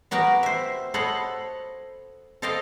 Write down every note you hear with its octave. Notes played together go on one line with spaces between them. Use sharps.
B3 F#4 G4 A#4
C5 E5
A4 C5 C#5 D#5 F#5 B5
A4 C5 D#5 F5 G5 A5